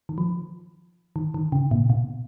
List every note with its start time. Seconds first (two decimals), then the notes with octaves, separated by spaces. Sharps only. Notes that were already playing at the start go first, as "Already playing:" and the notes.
0.09 D#3
0.18 F3
1.16 D#3
1.34 D#3
1.52 C#3
1.71 A#2
1.90 B2